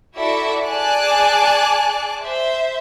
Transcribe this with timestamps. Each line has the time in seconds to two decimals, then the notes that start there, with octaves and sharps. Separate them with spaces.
0.17 E4 F#4 A4 D5 E5
0.68 G#4 D5 G#5 A5 D6 F#6
2.23 C5 E5